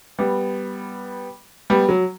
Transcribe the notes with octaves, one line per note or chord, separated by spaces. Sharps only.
G3 B3
G3 B3
F#3